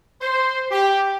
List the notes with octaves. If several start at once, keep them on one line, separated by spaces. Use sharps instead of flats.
C5
G4